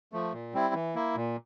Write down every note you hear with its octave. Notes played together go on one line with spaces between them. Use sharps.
F3 A3
A#2
G3 C4 E4
E3
A#3 E4
A#2